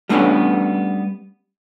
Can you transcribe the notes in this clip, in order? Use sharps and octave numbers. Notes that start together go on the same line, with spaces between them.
G3 A3 B3 C#4 D4